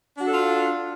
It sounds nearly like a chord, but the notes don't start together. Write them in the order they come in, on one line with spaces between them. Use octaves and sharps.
D4 F#4 A4 F4